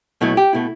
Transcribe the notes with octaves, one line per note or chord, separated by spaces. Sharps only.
B1 B2 F#3 A3 E4
G4
B2 A3 E4